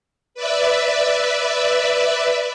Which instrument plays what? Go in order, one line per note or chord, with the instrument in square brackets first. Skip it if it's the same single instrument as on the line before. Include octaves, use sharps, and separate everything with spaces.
[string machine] B4 D5 E5